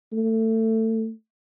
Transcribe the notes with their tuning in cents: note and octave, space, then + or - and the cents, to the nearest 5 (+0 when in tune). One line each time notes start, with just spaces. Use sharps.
A3 +25